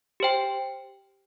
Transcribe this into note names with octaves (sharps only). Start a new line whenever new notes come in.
G4 C5 G5